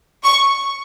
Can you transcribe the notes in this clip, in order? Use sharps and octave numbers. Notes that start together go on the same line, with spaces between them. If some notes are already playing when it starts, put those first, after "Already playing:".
C#6